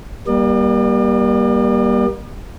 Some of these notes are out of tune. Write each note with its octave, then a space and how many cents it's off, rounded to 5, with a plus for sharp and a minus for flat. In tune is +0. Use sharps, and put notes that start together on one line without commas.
G3 +0 A#3 +35 D5 +45